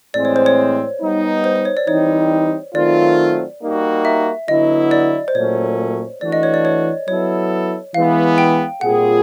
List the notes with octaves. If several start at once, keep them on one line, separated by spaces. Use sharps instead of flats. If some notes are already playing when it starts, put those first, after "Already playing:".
A2 E3 G#3 C4 D5
C#5
C5
C#5
G3 B3 D#4
C5
C5
C#5
D5
E3 G3 C4 D#4 C#5
D#3 F#3 A3 C4 F4 D5
G3 A#3 D#4 F#4
E5
D3 F#3 B3 E4 D#5
D5
C5
A#2 F#3 A3 C#4 C#5
E3 A3 D4 F#4 D5
D#5
C#5
D5
C#5
F#3 B3 E4 A4 C#5
E3 G#3 B3 F5
G5
A#2 G3 C4 F4 G#4 F#5